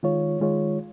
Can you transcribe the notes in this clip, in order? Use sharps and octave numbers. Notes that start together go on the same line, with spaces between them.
D#3 G#3 F4 C#5
D#3 G#3 F4 C#5